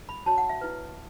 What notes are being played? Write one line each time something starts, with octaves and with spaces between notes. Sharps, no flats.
B5
F#4 C#5 A5
F#5
E5
E4 B4